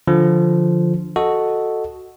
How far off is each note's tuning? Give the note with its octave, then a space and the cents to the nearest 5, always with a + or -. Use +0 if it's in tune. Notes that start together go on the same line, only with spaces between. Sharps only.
D3 +0 F3 -5
F#4 +0 A4 +0 D#5 +0